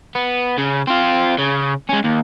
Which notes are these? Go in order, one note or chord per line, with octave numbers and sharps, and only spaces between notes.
B3
C#3
C4 F4
C#3
G#3 C#4
D#2